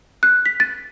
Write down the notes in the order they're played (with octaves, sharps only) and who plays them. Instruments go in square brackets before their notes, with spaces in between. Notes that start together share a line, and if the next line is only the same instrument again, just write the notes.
[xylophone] F#6
B6
A6